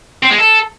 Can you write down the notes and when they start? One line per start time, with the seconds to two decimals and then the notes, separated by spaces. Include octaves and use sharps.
0.23 C4
0.31 G#3
0.38 A4